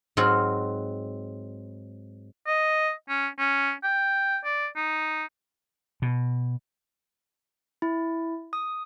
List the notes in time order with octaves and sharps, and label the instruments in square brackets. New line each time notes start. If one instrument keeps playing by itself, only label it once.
[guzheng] G#2 F#3 C4 F4 F#4 F#5
[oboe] D#5
C#4
C#4
G5
D5
D#4
[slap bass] B2
[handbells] E4
D#6